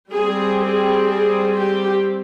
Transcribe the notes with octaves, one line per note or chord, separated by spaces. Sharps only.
G3 C4 G#4
G#4
G#4
G4